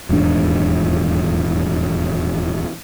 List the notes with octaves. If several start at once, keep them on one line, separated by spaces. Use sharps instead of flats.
D#1 E2 G#2 D4